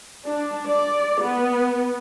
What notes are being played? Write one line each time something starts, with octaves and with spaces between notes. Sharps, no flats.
D4
D5
B3